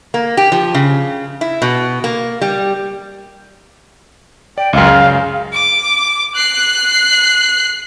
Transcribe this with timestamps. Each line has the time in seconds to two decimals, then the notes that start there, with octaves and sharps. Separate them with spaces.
0.14 A#3
0.37 G4
0.52 F3
0.74 C#3
1.41 E4
1.62 B2
2.04 A#3
2.41 G3
4.58 D5 G5
4.73 C#2 F#2 F5
4.87 C#3
5.54 D6
6.36 F#6 C7